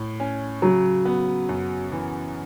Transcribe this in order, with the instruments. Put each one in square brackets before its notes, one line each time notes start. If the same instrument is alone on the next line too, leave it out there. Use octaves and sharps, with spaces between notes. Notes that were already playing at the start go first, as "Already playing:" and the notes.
Already playing: [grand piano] A2
C#4
[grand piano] C#3 [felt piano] F#3
[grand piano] B3
F#2
E3